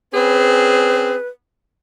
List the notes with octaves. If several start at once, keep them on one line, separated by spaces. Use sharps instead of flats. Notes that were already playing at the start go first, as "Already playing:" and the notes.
C4 C#4 G#4 B4